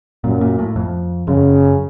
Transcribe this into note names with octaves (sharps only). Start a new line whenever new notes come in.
F#2 A#2
A#2
A2
F2
F#2 C#3